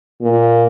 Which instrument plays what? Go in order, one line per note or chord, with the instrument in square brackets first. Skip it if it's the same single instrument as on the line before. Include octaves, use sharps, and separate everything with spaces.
[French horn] A#2